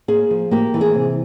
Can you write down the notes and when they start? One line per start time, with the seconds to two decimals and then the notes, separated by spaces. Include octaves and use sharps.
0.08 A#3 G#4
0.31 F3
0.51 A#3 G4
0.74 E3
0.81 G#4
0.95 C3